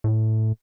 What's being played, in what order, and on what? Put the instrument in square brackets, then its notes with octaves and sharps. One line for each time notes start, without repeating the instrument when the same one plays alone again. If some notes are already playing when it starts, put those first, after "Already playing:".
[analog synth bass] A2